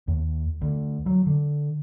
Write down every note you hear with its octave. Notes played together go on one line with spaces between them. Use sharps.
D#2
D2
F#3
D3